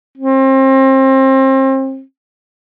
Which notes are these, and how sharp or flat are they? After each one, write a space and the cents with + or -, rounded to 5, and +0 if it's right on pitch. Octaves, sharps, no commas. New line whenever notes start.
C4 +30